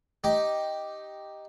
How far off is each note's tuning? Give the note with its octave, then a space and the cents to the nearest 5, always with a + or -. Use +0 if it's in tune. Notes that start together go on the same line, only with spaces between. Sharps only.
D#4 +0 G4 +0